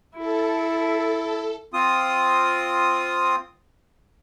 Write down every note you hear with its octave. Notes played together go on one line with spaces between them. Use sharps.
E4 A4
C4 F4 D#6